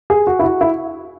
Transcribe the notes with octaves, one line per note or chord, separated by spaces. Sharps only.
G#4
F#4
E4
F#4
E4